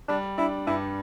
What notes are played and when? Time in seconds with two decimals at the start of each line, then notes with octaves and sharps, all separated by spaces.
0.09 G3 D4
0.38 D4 E4
0.67 G2 E4